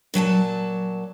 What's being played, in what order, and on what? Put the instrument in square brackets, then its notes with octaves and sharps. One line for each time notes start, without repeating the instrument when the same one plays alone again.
[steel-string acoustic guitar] A#2 F#3 G#5 A5